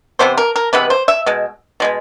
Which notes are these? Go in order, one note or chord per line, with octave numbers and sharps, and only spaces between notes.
C3 E3 G#3 B3 C5
A#4
A#4
C3 E3 G#3 B3 B4
C5
E5
B2 G#3
B2 G#3 B3